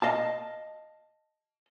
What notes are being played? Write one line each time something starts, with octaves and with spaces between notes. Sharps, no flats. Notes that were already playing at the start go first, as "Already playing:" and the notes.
D#5 F5 A5